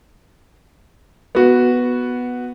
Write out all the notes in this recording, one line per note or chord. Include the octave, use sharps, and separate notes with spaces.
B3 F#4